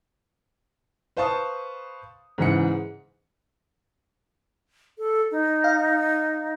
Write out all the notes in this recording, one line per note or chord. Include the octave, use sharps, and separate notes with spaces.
B4 C5 F5 A5 C#6 D#6
G#2 C#3 E3 G#4 F#5 C#7
A4
D#4
F5